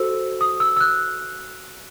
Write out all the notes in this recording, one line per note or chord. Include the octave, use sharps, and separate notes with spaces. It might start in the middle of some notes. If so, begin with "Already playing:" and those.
Already playing: F#4 A4 C5 E6
D#6
E6
E6
F#6